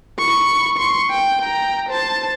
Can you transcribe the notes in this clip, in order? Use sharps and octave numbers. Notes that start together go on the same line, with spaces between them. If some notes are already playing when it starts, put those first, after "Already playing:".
B5 C#6
C6 C#6
G5
G5 A#5
C5 A5